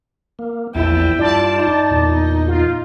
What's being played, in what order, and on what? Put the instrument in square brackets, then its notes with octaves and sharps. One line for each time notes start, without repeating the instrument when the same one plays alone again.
[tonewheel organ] A#3
[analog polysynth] A#1 [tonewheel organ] E2 A5 [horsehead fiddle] E4 G5
[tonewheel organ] G2 F4 [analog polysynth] D5 A5
[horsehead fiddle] D#4
[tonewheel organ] E2 A#2
[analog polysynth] F4